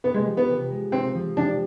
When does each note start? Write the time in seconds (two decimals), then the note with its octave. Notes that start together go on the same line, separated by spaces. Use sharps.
0.04 C3 B3
0.14 G#3
0.26 F3
0.37 B3
0.49 C3
0.70 G#3
0.92 C3 C4
1.15 F3
1.36 C3 D4